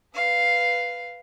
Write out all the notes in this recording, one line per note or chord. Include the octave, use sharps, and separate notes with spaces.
B4 F5